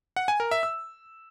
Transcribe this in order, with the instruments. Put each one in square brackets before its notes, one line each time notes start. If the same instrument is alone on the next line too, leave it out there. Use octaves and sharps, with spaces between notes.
[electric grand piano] F#5
G#5
A#4
E5
E6